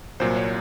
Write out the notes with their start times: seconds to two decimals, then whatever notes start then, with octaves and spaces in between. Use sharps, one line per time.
0.20 C2 A#2 F#3 C5
0.36 C#5